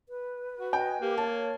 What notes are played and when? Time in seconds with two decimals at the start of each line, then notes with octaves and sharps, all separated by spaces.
0.09 B4
0.60 F#4
0.73 D#5 G5 G#5
1.01 A#3 G4
1.18 C#5 A5